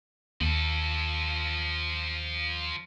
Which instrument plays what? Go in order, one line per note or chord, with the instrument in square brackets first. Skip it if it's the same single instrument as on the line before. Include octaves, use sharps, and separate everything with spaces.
[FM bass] D#2 [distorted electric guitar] F3 A4